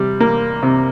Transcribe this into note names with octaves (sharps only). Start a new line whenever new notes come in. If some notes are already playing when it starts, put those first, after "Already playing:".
Already playing: C3 G3
A#3
C3